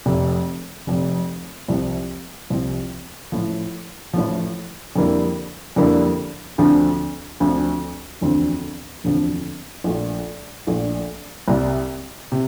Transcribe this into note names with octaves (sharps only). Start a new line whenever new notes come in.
F1 F2 C3
F1 F2 C3
C2 C3 F3 C4
C2 C3 F3 C4
A1 A2 F3
A1 A2 F3
F2 D3 G3 A#3 E4
F2 D3 G3 A#3 E4
D2 D3 F3 C4
D2 D3 F3 C4
E1 D2 D3 F3 C4
E1 D2 D3 F3 C4
A#1 A#2 A3 D4 F4
A#1 A#2 A3 D4 F4
C2 C3 G3
C3